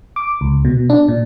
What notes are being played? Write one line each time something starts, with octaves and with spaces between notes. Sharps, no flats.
D6
C#2
B2
D4
A#2